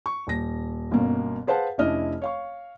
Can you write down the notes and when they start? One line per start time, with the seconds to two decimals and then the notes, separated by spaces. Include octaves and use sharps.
0.06 C#6
0.27 D#1 A#6
0.91 G1 B2 A#3 C#4
1.47 G#4 B4 C5 F5 F#5 A5
1.78 F1 C#4 D4 E4 D#5 F6
2.22 C#5 F5 C#6